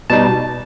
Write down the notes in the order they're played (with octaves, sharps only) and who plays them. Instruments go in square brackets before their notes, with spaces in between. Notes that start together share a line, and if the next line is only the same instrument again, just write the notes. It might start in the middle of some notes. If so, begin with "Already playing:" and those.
[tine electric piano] B2 G3 D#4 A5